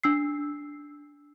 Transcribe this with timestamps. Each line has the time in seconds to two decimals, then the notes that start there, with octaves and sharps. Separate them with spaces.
0.04 D4 E6 C7